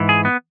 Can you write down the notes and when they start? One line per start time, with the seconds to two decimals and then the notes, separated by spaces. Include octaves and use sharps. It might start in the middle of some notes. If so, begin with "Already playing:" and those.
Already playing: G#2 E3
0.09 G#4
0.25 B3